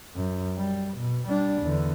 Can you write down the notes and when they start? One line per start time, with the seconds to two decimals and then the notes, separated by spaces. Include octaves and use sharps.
0.15 F#2
0.57 G3
0.98 B2
1.28 G3 D4
1.62 E2 D3